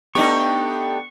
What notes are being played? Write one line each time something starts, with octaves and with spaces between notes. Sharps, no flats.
A3 B3 D4 D#4 G4 G5 C#6